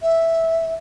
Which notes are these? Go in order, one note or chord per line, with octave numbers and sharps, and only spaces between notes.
E5